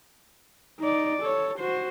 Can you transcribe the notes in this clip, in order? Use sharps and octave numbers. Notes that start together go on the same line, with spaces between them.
D#4 D5
A4 C#5
F#4 C5